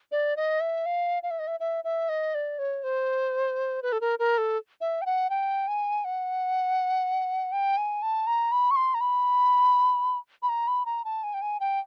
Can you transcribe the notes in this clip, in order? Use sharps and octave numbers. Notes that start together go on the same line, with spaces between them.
D5
D#5
E5
F5
F5
E5
D#5
E5
E5
E5
D#5
D5
C#5
C5
B4
A4
A#4
A#4
A4
E5
G5
F#5
G5
G#5
F#5
G5
G#5
A5
A#5
B5
C#6
C6
A#5
B5
B5
A#5
B5
A#5
A5
G#5
G5
G#5
G5